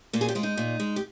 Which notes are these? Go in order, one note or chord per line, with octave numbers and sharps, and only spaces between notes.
A#2 A#3
G#4
G4
G#3 F4
D#4
A#2
G#3
G4